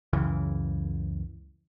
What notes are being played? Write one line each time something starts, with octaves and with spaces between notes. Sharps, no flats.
C#2 F#2 C#3 E3